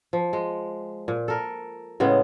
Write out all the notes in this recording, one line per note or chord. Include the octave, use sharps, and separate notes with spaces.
F3
G#3
A#2
A4 A#4
A2 C#3 G#3 B3